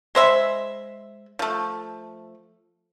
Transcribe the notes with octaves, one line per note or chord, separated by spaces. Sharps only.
G#3 C5 E5 B5
F3 A3